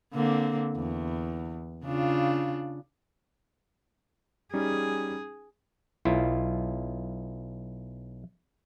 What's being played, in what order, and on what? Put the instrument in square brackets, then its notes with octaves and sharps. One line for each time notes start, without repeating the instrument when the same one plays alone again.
[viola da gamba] D3 A#3 C4
E2
C#3 D4 F4
[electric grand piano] G3 C#4 D#4 [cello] G#4
[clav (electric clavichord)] B1 E4 F4